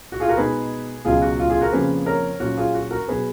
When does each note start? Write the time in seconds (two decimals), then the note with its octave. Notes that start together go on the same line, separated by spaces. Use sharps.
0.12 F#4
0.20 F4 G#4
0.28 F#4 A#4
0.37 B2 G#3 D#4 G#4 B4
1.05 C#2 B2 F#3 C#4 F4 G#4
1.22 F#4
1.39 F4
1.50 F4 G#4
1.61 F#4 A#4
1.72 F2 C#3 F3 A#3 C#4 G#4 B4
2.06 A#4 C#5
2.40 A#2 F#3 A#3 C#4 F#4
2.57 F4 G#4
2.74 F#4
2.91 F#4 A#4
3.08 B2 F#3 G#4 B4